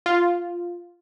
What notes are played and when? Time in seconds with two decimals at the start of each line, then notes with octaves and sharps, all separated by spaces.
0.06 F4